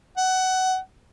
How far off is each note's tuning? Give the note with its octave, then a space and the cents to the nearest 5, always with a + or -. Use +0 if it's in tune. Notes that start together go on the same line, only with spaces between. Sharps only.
F#5 +20